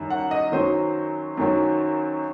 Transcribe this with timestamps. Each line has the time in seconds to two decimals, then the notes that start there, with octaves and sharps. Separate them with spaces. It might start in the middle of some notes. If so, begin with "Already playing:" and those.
Already playing: F#2 D#3 G3
0.10 F#5
0.31 D#5
0.52 F#2 D#3 F#3 C5
1.37 F#2 D#3 F#3